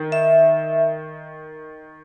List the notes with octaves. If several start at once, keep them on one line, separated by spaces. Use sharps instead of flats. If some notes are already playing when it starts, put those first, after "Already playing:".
Already playing: D#3
E5